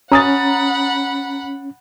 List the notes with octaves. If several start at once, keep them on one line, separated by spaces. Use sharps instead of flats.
C#4 F#5 A#5 B5 D#6 A6